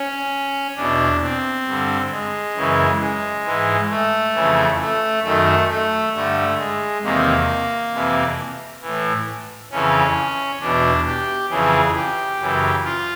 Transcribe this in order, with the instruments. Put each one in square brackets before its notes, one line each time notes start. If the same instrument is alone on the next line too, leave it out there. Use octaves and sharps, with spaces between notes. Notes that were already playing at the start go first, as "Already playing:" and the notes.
Already playing: [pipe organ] C#4
E2 B2 D4
C4
G2 D3
G#3
F#2 C#3 E3
G#3
G#2 E3
A3
F2 C#3 E3
A3
F#2 D#3 A3
A3
G2 D3 A3
G#3
E2 C3 D#3 A#3
F2 C3 E3
A2 E3
F2 C#3 E3 C#4
E2 B2 D4
G4
F2 C#3 E3 G#4
G4
F#2 C#3 E3
F4